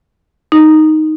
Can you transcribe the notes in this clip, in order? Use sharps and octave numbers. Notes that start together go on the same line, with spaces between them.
D#4